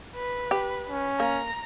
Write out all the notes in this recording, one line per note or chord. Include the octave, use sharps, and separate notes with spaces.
B4
G4
C#4
A#3 A#5